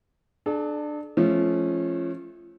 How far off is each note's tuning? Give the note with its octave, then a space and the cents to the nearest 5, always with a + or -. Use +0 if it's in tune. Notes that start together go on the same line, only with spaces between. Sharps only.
D4 +20 A4 -45
F3 -20 A3 -35 C#4 -20